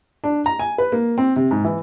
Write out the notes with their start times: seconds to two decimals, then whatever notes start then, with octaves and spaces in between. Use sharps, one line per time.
0.24 D4
0.46 A#5
0.59 G#5
0.78 B4
0.92 A#3
1.18 C4
1.36 C3
1.51 G#2
1.65 E3